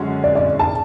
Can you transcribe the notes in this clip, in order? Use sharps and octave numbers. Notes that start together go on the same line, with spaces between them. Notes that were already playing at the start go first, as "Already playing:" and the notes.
Already playing: F#2 D3 G#3 C#4 F#4
D5
D5
A5